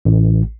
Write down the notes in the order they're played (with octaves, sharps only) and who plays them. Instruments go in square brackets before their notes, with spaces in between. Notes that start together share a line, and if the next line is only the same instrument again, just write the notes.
[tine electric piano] A1